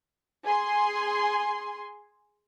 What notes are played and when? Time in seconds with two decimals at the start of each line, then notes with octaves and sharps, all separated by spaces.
0.45 G#4 G#5 C6